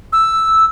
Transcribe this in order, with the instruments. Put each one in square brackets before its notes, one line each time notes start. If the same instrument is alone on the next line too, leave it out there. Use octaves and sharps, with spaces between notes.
[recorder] E6